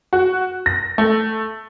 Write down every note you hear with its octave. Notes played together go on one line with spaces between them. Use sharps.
F#4
A#6
A3